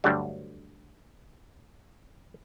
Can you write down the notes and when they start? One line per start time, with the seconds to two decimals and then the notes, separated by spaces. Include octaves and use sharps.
0.04 D2 G2 D3 F#3 G3